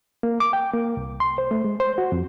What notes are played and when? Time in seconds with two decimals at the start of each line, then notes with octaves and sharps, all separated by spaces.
0.23 A#3
0.40 D6
0.53 G5
0.73 A#3
0.97 C2
1.20 C6
1.38 C5
1.51 A3
1.64 G#3
1.80 C5
1.98 F#4
2.12 F2